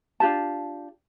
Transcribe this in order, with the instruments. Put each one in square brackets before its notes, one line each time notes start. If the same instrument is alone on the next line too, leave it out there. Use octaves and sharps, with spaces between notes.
[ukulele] D4 F4 G4 A5